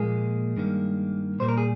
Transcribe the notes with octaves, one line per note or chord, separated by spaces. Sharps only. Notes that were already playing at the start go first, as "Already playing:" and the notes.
Already playing: A#2 F3 G#3 A#3 G#4
G2 D#3 A#3
A#2 G3 A#3 C5
A#4
G#4